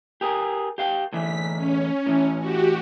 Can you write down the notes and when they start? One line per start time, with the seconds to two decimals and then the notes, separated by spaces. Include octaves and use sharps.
0.21 G4 G#4 A#4
0.78 G4 F5 G5
1.13 A2 D3 E3 B6
1.57 C#4
2.06 A2 E3
2.39 F#4 G4